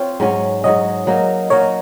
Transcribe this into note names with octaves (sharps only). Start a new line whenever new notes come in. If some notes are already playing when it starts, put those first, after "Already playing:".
Already playing: C4 F4 C#5
G#2 F#3 C#4
G#2 F#3 C#4 D#5
F#3 A#3 D#4 A#4
F#3 A#3 D#4 A#4 C#5